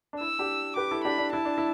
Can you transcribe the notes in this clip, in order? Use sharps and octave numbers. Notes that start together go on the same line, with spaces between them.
D4
E4 E6
D4 G4
G4 B4 D6
E4 A4
D4 G4 B5
D4
E4 A5
D4
E4